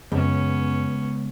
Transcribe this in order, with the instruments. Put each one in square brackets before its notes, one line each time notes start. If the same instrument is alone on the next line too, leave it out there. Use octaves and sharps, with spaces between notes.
[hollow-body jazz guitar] C#2 [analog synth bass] F#2 [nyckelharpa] B3 C#4